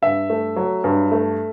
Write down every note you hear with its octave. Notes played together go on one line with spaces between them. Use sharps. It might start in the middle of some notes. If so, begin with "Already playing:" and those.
G2 E5
A3
F#3
G2
A3